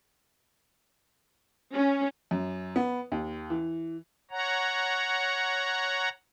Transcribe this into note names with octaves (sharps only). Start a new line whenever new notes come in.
C#4
F#2
B3
D#2
E3
C#5 F#5 A#5